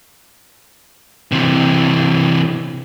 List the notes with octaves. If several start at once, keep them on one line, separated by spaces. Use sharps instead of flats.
C3 E3